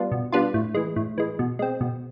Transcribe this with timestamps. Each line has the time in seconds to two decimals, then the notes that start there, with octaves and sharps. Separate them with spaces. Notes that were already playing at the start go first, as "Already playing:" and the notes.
Already playing: G3 B3 D4 F4
0.12 B2
0.32 G3 B3 D4 F4
0.54 A2
0.74 E3 G#3
0.96 A2
1.18 E3 G#3
1.39 B2
1.59 G#3 C4
1.81 B2